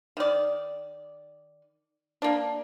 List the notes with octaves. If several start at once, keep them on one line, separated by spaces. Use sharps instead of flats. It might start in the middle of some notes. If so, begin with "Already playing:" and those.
D#3 D5
A#3 D4